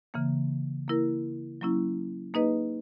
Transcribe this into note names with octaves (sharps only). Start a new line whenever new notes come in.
C#3 E3 A#3
A#3 E4 A#4
F#3 A#3 C#4 E4
A#3 D#4 G#4 B4 D#5